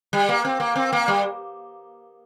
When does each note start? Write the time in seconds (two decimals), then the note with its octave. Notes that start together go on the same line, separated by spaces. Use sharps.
0.13 G3
0.29 A#3
0.45 C4
0.60 A#3
0.76 C4
0.93 A#3
1.08 G3